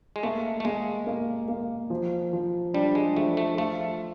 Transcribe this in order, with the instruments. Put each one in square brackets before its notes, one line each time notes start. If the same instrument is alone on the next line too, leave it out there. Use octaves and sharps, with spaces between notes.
[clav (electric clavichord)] G#3
[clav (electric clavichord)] A3 [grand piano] A#3
[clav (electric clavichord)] A3
[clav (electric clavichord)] G#3 [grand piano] A#3
[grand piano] A#3
A#3
F3
F3
[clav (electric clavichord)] G3 [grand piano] D4
[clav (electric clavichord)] G#3
[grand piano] F3 [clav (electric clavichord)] A3
[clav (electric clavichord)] A3
[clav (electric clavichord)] A3 [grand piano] F4